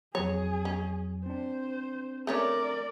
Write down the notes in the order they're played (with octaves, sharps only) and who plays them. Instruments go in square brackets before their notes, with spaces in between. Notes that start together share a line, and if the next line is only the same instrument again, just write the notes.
[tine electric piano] F2 F#3 [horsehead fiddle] G#4 [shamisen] C#5
[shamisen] C#4
[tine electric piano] C4 D4 [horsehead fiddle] C5
[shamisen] A3 C#4 C#5 [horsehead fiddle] A#4 D5